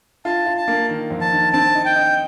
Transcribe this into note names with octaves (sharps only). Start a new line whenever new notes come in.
F4 A5
F4
A5
A#3
D#3
F2
A5
D#3
C4 A5
D#4
G5
D#4